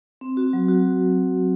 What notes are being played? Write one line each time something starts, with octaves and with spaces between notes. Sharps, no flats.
C4
F#4
F#3
F#4